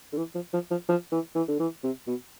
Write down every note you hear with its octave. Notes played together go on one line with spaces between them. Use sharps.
D3
E3
F3
F3
F3
F3
E3
E3
D3
E3
C3
B2